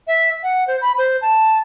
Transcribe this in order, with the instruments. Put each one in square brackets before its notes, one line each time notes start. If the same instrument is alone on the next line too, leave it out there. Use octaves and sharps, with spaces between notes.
[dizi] E5
F#5
C5
B5
C5
A5